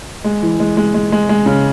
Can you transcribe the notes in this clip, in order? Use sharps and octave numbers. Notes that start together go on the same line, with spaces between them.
G#3
E3
G#3
G#3
G#3
G#3
G#3
C#3